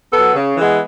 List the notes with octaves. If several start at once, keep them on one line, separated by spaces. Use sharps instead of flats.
F#3 B3 A4
C#3
E3 G#3 B3